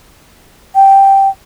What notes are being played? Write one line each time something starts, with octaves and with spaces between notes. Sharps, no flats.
G5